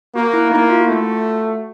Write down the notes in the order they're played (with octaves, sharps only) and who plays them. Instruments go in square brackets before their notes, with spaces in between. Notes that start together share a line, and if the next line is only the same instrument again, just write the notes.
[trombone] A#3 [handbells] F#4
[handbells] E4
[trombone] A#3 [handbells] D#4
[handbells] E4
F4
F#4
[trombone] A3 [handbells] F4
[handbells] F4
F#4